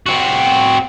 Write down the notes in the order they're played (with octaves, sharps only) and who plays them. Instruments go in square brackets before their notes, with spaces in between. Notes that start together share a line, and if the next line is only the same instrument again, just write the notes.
[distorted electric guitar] C4 F#4